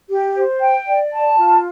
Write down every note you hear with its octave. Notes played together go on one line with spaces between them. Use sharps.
G4
C5
G5
D5
A5
F4